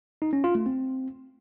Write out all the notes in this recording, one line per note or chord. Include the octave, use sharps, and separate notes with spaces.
D#4
C#4
F4
A3
C4